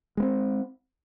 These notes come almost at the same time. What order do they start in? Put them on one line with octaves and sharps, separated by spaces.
G#3 B3 C4